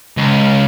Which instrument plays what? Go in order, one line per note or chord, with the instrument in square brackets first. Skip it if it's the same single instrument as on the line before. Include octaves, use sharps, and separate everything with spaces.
[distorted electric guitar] C#2